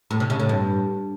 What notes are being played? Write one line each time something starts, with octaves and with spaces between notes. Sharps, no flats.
A2
C3
C#3
A2
G2